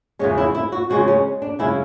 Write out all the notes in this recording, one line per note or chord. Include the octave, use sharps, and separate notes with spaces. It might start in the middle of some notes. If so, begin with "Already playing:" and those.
E2 C#3 G#3 C#4
E4
E4
F#4
E2 C#3 G#3 F#4
C#4
D4
F#2 C#3 G#3 E4